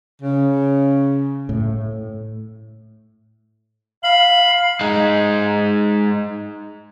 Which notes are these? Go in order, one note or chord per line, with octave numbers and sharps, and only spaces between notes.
C#3
A2
F5 B5
G#3 D#4